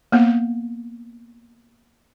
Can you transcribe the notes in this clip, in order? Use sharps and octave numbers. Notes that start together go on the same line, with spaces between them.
A#3 B3